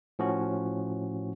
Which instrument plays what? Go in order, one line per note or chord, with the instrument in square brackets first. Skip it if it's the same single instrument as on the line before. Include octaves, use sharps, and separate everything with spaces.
[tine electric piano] A2 F3 C#4 F#4